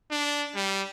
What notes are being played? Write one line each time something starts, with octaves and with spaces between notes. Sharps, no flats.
D4
G3